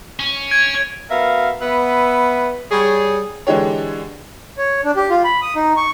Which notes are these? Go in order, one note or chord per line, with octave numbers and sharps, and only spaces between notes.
C#4
G#6 D7
B3 F#4 A#4 E5 F5
B3 B4 E5
G3 G#4 C#5
D3 E3 G#3 D4 G4 C#5
C#5
D4
G4
F4
B5
D#6
D#4
C#6